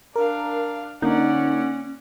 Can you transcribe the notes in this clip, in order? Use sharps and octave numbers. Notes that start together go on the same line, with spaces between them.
D4 A#4 F5
D3 A#3 C#4 D#4 D5 F#5